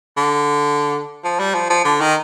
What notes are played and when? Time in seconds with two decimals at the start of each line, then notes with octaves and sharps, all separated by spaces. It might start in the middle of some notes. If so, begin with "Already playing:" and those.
0.17 D3
1.24 F3
1.39 G3
1.55 F3
1.70 F3
1.85 D3
2.01 D#3